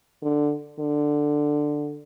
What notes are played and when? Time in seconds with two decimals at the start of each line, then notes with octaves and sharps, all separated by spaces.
0.23 D3
0.79 D3